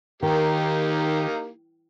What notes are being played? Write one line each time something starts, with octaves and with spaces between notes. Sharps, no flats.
D#3 A#3 D#4 G4